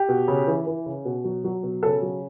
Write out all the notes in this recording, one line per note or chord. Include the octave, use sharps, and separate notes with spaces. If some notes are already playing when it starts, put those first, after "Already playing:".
Already playing: G4
B2
C#3
E3
E3
C#3
B2
F#3
F#3
B2
C#3 A4
F#3